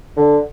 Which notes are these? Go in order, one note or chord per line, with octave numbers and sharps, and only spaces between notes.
D3